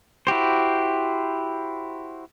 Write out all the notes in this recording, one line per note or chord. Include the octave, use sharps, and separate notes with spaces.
E4 F#4 G4 C5